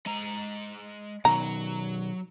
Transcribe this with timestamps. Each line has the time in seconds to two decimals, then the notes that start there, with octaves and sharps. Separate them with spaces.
0.06 G#3 A#5
1.25 B2 D#3 F#3 A#5